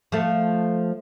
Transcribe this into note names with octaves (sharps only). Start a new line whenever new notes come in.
F3 A3